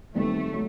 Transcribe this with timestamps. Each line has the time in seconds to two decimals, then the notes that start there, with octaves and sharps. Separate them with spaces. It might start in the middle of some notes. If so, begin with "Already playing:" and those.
0.14 E2 C3 D#3 G3 A3 B3
0.51 F#3 A3